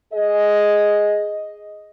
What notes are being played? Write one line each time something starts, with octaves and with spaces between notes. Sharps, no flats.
G#4 D#5